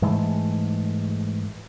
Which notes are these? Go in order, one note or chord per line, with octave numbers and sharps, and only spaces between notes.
G#2 E3 G#3 A3